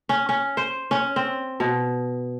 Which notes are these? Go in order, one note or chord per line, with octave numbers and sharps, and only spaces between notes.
C#4
C#4
C5
C#4
C4
B2